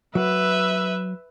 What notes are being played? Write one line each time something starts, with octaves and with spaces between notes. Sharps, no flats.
F#3 B4 E5